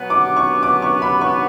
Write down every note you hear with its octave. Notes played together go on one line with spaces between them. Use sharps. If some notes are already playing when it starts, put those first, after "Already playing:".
Already playing: B2 F#3 B3
D6
C#6
D6
C#6
B5
C#6